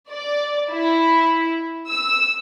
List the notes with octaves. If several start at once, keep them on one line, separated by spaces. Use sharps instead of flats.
D5
E4
E6